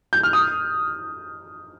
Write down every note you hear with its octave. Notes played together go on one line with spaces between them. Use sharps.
G6
F6
D#6